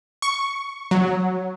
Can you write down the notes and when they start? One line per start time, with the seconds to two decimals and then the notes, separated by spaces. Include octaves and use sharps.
0.22 C#6
0.91 F#3